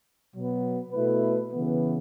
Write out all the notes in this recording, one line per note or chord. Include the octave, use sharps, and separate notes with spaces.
B2 F#3 B3
B2 A3 E4 B4
C#3 E3 B3